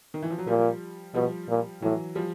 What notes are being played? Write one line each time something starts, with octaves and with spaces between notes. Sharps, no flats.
D#3
E3
F3
F#3
A#2 F3 G3
B2 F3 G3
A#2
A2 E3 F#3
F3 G3